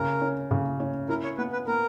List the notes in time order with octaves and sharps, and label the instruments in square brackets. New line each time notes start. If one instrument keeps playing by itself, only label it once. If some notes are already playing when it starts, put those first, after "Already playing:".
Already playing: [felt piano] C#3 C#4 [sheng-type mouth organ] A#4
[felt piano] C#4
C#3
C#4
[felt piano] E4 [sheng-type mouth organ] A#4
[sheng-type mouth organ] C#5
[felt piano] B3 [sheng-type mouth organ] B4
[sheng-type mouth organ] B4
[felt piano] B3 [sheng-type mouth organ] A#4